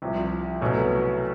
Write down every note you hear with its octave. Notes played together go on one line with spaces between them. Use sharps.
C2 C3 F3
C2 B2 F#3 A3 C#4